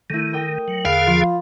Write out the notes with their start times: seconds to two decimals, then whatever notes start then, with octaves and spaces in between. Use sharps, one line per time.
0.10 D#3 A3 E4
0.33 A#4 G5 D#6
0.68 F#3
0.85 E2 D3 G#4 F5 B5 F#6
1.07 F3 F4